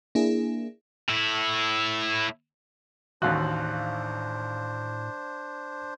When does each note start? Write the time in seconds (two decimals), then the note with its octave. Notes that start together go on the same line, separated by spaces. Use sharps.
0.15 A#3 D4 E4 G#4
1.09 A2 E4
3.22 A1 D#2 A2 D4 F#4 C5 F5 F#6